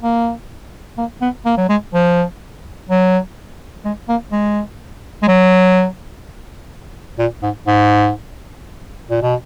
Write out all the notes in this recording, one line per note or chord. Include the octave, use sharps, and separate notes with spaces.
A#3
A#3
B3
A#3
F#3
G#3
F3
F#3
G#3
A#3
G#3
G#3
F#3
A#2
G#2
G#2
A#2
B2